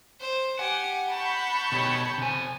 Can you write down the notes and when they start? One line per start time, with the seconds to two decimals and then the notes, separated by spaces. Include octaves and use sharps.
0.20 C5
0.59 G4 F#5 G#5
1.12 A5 B5 C#6 G6
1.72 B2 G4 C#5
2.18 C3 G#5